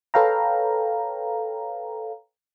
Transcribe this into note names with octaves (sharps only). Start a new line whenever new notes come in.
A4 B4 C#5 F5 G5 A#5